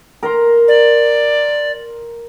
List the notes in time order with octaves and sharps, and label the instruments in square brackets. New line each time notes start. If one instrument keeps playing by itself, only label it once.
[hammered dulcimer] A#4 A#5 C6
[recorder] D5